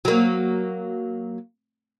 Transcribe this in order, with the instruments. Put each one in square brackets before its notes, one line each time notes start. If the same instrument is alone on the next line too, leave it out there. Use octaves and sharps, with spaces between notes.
[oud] F#3 A#3